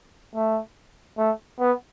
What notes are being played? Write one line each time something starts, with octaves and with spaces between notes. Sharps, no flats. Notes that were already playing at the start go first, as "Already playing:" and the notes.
A3
A3
B3